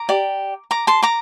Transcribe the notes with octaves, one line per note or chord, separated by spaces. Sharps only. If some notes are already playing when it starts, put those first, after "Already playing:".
Already playing: A#5 D6
G4 D5
A#5 D6
A5 C6
A#5 D6